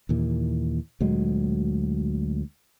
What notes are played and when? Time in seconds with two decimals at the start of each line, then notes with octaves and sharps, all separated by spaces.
0.09 D#2 A#2 E3
1.01 D2 A#2 F#3 G#3